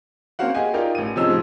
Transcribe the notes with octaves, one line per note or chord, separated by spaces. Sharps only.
A#3 C4 C#4 F#4 F5 F#5
G4 G#4 D#5 G#5
D#4 F4 G4 A#4 D5
A1 D#7
C3 F3 C#4 D#4 G#4 E6
A2 F3